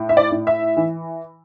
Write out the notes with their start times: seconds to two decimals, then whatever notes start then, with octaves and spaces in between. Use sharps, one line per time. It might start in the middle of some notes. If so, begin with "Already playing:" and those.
Already playing: A2
0.09 E5
0.17 D5
0.31 A2
0.47 E5
0.77 E3